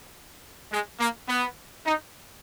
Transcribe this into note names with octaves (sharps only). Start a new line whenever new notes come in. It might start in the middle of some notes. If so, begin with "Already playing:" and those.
G#3
A#3
B3
D#4